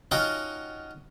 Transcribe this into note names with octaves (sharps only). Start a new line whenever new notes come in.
C#4 D#4 F4 F#4 F#5 G5